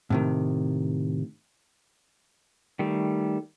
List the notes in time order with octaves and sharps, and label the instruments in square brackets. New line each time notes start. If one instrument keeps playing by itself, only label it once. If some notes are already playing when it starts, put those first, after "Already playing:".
[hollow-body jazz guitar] A2 C3 D#3
[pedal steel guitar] D#3 G3 A3